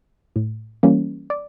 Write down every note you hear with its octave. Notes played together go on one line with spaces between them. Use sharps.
A2
E3 G3 A#3 C#4
D5